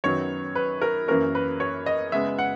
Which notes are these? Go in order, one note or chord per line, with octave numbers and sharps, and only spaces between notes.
F#2 D#3 F#3 B3 C#5
B4
A#4
F#2 E3 A#3 C#4 A#4
B4
C#5
D#5
C#3 G#3 B3 E5
F#5